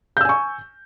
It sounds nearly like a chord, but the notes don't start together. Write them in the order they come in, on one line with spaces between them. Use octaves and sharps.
G6 E6 G#5 C#6